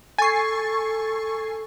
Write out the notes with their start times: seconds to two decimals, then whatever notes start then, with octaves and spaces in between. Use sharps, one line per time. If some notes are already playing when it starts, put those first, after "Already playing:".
0.18 A4 G#5 C#6 A6 C7